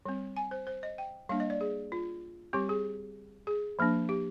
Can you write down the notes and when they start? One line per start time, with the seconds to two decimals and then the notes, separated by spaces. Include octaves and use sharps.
0.06 G3 C4
0.37 G#5
0.51 C5
0.67 C5
0.83 D#5
0.98 G5
1.29 G3 A#3 D4 F5
1.40 D#5
1.50 D5
1.61 G#4
1.92 F4
2.53 G3 C4 G4
2.69 G#4
3.47 G#4
3.79 F3 A#3 D4
4.09 G4